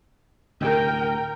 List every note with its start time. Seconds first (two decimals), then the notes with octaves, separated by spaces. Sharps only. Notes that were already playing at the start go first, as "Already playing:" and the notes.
0.61 D2 A2 C3 A#4 G5